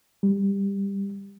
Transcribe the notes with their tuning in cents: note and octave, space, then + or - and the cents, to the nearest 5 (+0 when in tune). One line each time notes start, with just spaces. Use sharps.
G3 +15